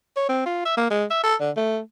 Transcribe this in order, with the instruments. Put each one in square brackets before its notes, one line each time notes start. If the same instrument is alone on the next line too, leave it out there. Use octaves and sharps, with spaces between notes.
[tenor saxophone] C#5
C4
F4
E5
A#3
G#3
E5
A4
D3
A3